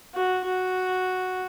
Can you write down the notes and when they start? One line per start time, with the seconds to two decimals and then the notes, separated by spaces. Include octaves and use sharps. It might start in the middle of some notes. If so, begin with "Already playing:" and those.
0.14 F#4
0.45 F#4